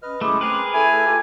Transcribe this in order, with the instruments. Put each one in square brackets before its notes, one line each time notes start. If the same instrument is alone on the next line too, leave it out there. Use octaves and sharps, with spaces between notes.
[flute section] C#4 [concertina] B4 D#5 F6
[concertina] G#3 E4 G#4 [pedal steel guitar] A3 [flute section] C#4 C6 D6
[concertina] C4 F#6 [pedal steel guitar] G#4 A#4 B4
[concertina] A3 E4 E5 [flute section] A4 [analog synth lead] G#5
[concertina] F4 G4